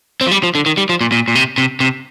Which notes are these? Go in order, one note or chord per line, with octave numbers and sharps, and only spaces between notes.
C4
F3
G3
F3
D3
D#3
G3
F3
A#2
A#2
A#2
C3
C3
C3